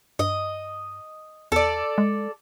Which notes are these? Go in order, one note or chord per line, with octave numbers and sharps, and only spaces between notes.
G2 D#5
E2 A4 D5
G#3